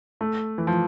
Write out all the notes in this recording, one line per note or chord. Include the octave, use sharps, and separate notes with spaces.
A3
E3
F3